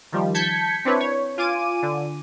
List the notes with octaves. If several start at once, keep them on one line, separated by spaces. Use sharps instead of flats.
D#3 F3 G3
A5 G6 G#6 B6 C#7
C4 D4 E4 B4 C#5
C#5
F4 G#5 D6 D#7
D3